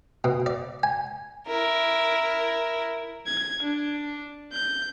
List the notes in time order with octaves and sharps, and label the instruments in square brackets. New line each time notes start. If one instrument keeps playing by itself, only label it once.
[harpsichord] B2
D5
G#5
[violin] E4 A#4
[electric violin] G#6
D4
G6